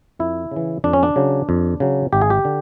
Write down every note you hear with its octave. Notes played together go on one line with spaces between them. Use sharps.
F2 E4
C#3 E3
F2 D4
C#4
D4
C#3 F#3
F2
C#3 F#3
G#1 G4
G#4
G4
D3